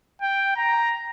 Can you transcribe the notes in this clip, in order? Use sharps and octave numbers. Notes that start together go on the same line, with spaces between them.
G5
A#5